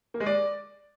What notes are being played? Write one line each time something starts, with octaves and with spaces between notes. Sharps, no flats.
A#3
G#3
D5